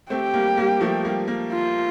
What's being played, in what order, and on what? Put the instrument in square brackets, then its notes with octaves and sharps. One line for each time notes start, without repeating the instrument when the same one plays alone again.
[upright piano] A3 C4 [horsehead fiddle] G4
[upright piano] G3 A#3
G3 A#3
F3 A3
G3 A#3
G3 A#3
[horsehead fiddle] F4